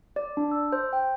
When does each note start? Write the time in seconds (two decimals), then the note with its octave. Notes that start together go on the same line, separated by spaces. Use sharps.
0.16 D5
0.37 D4
0.52 E6
0.72 C5
0.93 G5